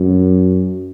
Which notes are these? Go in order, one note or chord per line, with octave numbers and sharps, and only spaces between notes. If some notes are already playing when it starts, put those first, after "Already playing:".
Already playing: F#2